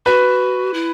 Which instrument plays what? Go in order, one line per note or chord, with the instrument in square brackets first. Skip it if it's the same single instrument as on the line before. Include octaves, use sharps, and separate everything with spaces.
[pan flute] F#4 [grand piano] B4
[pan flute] E4